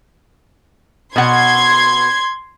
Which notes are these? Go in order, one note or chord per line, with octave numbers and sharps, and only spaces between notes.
B2 F#5 C6 G#6